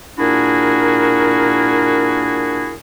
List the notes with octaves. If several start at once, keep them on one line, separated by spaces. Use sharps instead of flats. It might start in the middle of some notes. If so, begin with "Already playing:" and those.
A#2 D4 E4 F#4 G#4 A#4